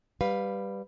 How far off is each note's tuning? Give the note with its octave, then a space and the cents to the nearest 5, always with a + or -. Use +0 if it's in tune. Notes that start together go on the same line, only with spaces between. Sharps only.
G3 +0 B4 +0 F5 +15